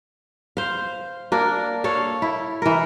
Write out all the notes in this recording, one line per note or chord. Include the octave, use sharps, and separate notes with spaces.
C5 F5
A#3 D4 A#4
A4 C#5 F5
E4
E3 A#4